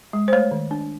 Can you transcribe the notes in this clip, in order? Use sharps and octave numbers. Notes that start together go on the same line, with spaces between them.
G#3
C5
A3 C#5
D#3
D4